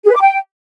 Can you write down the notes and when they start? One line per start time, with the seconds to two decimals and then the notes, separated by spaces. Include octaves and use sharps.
0.04 G#4
0.10 B4
0.15 D6
0.21 G5